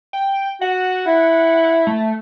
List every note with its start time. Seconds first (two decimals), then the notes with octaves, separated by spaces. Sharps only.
0.13 G5
0.61 F#4 F#5
1.06 E4
1.87 A3